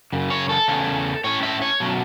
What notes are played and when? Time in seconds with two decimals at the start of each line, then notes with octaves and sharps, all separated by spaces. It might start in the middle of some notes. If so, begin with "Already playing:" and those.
0.13 F#2 C#3
0.30 C#5
0.49 A4
0.68 E2 C#3 A3 C#4
1.24 A2 A3 C#4 C#5
1.43 E5
1.62 C#5
1.80 B2 F#3 A3 C#4